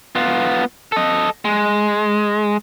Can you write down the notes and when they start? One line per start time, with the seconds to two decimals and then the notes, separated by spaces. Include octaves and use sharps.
0.16 B3 F4
0.92 A4 D#5
1.45 G#3